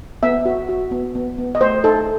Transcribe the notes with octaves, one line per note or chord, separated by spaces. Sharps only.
B3 E5
F#4
F#4
B3
B3
B3
D#5
A3 C5
D#4 A4